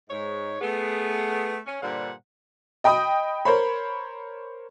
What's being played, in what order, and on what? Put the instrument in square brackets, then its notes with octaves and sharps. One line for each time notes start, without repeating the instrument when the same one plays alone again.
[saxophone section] G#2 C#5
A3 B3 G#4
C#4
G2 A#2 D3 G3 C5 F#5
[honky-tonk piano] D#5 G5 B5 D#6
A#4 C5 C#5 B5